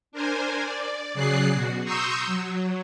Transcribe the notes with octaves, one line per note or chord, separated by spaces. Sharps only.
D4 A#4 C5 G#5
D5
C#3 F#3 G#4 D5 F#6 C7
B2 F#4
A#5 C6 C#6 D#6 E6 G6
F#3